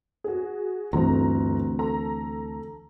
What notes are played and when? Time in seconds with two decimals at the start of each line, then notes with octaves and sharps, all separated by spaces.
0.24 F#4 G#4
0.93 G1 D2 E3 C4 A#5
1.79 A4 A#5